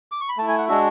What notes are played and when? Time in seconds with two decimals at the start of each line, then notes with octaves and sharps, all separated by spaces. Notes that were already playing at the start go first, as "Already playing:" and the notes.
0.12 D6
0.21 C#6
0.29 B5
0.38 A3 A5
0.42 E4
0.48 G#5
0.58 F#5
0.68 G#3 D4 F#4 E5